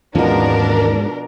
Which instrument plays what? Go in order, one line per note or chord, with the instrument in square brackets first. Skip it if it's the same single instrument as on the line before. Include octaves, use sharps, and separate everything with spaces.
[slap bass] D#2 E3 C#4 [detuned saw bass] G#2 [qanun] B2 F3 [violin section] D4 A#4